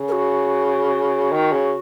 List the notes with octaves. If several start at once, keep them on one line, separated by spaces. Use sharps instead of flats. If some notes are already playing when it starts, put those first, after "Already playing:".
Already playing: C#3
A#4
F#4
D#3
C#3